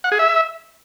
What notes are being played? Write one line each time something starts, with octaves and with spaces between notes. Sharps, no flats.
F#5
G#4
E5